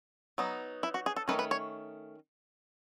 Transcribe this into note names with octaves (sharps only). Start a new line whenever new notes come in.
F#3 B3 D#4
E4
F#4
G#4
A4
D#3 A3 C#4 B4
B4
C#5